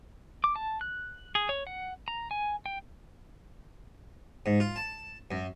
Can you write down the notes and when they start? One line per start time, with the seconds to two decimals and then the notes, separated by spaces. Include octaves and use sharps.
0.44 D6
0.56 A5
0.81 F#6
1.35 G#4
1.49 C#5
1.67 F#5
2.08 A#5
2.31 G#5
2.66 G5
4.46 G#2
4.60 F4
4.76 A5
5.31 F#2